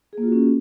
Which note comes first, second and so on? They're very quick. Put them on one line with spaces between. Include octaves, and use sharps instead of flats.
G#4 A#3 F4 F#4 C#4